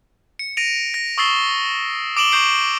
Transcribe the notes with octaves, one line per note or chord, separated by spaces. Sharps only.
C#7
A#6 D7 D#7 F7
A#6
C#6 D#6 E6 A6 C7 G7
D6 D7 E7 F#7 G7
C#6 D6 G6 C7 D7